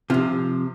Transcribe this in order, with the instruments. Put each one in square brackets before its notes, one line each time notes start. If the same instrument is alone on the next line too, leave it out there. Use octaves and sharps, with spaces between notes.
[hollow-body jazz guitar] C3 F3 F4